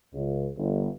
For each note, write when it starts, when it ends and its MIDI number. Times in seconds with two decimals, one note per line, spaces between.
0.13 0.46 37
0.56 0.87 31